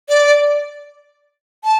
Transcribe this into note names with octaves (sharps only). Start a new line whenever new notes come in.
D5
A5